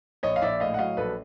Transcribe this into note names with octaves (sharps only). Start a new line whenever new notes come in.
A#1 C#5 D#5
F5
A#1 D5 E5
A2 D#5 F5
F#5
F#3 D#5 F5
A#1 A4 B4